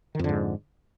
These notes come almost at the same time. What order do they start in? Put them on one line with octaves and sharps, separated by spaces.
D#3 F2 D3 G#2